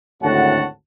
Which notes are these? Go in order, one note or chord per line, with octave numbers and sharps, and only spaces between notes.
G#1 D2 A2 F#4 F#5 A5